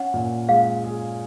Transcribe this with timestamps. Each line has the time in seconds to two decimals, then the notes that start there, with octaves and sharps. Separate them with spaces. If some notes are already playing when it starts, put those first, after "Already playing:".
Already playing: C#4 F#5
0.14 A#2
0.49 G#3 F5
0.84 G#4